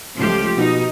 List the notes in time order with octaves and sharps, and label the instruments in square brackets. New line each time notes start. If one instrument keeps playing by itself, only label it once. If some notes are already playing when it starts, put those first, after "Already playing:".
[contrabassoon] C#2 [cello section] F3 A3 G4
[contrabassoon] B2 [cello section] D#4